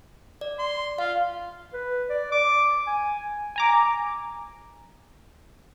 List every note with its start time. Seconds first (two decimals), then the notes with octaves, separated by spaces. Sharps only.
0.41 D5
0.58 C6
0.98 F4 F5
1.73 B4
2.10 D5
2.32 D6
2.87 G#5
3.56 G#5 A#5 D6